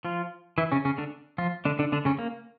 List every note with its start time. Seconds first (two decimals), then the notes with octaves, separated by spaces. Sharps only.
0.05 F3 F4
0.58 E3 E4
0.72 C#3 C#4
0.85 C#3 C#4
0.98 D3 D4
1.38 F3 F4
1.65 D3 D4
1.79 D3 D4
1.92 D3 D4
2.05 C#3 C#4
2.19 A#3